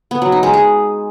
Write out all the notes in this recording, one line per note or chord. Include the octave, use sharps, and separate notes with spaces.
B3
F#3
D#4
G#3
G#4